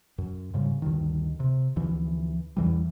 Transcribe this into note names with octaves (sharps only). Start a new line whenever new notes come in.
F#2
G#2 C#3 G3
D2 G2 D#3
C3
D2 E3 F3
E2 E3 G3